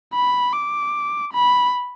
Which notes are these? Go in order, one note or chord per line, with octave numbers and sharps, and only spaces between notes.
B5
D6
B5